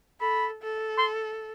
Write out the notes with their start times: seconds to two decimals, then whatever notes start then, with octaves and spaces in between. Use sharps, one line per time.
0.21 A4 B5
0.63 A4
0.98 C6